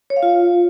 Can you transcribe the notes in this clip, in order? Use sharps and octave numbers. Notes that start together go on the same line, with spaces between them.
C#5
F5
F4